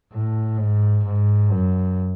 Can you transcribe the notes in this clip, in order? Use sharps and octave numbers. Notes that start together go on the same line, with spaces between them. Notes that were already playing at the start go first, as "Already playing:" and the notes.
A2
G#2
G#2
F#2